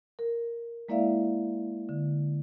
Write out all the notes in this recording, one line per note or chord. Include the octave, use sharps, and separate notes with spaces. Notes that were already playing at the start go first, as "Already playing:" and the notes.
A#4
G#3 A#3 E4 D5 E5 F5
D3